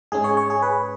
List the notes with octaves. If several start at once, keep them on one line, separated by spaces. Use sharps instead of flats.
G#2 G#3 C#4 G#4
C#5
C#5
G#4
B4